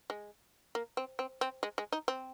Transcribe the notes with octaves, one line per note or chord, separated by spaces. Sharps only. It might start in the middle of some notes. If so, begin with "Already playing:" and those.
G#3
A#3
C4
C4
C4
G#3
G#3
D#4
C4